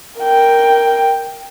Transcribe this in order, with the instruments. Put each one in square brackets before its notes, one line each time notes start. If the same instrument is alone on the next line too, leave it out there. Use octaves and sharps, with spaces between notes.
[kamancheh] A#4 G5